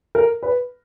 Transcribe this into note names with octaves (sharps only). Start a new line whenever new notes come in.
A#4
B4